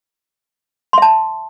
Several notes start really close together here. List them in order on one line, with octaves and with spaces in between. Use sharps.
C6 E5 A5